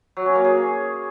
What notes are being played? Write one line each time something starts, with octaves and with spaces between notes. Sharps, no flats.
F#3
C#4
A#3
G#4